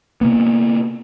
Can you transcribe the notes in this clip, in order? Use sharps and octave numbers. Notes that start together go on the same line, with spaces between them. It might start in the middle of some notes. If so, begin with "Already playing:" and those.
C3 A#3 B3